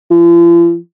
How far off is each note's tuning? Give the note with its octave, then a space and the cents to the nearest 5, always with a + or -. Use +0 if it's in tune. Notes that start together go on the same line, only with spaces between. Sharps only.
F3 -45